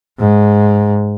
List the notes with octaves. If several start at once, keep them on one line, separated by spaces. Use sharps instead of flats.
G#2